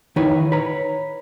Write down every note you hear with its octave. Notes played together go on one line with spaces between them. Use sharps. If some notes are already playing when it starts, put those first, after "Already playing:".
D#3 D#4 E4 B4 C#5
B4 C#5 A#5